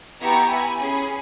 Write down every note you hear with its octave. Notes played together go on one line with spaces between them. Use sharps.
B3 E4 G4 A#5 C#6
G#5 B5
C#4 G#4 G#5 B5